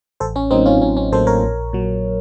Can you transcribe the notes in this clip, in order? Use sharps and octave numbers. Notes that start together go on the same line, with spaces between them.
A1 A4 C5
C#4
A2 F#3 A#3 C4 D#4
C#4 F4
A1 C#4
C#4
A2 F#3 A#3 A4 C5
A#4 C#5
A#1
A#2 F#3